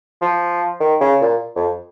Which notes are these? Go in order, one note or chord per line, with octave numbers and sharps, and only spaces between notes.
F3
D#3
C#3
A#2
F2